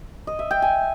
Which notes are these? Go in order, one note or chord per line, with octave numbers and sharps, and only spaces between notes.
D#5
E5
G5
G#5